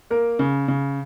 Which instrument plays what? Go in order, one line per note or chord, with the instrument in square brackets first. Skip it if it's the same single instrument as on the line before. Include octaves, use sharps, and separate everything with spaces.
[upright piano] A#3 A#4
C#3
C#3